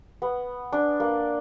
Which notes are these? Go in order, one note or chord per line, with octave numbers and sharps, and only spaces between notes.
B3
D4
A#3